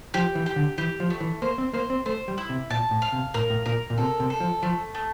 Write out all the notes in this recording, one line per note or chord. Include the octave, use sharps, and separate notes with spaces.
F3 G4
E3
G4
D3
E3 G4
F3
A3
E3
A#3 C5
C4
A#3 C5
C4
A3 C5
G3
E4
C3
A#2 A5
A2
F5
C3
A2 A#4
A2
A#2 A#4
A#2
C3 A4
C3
A4
F3
F3 A3
A3